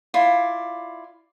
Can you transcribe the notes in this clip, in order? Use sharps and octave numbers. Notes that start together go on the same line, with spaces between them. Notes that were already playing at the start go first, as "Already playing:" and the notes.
E4 F4 D5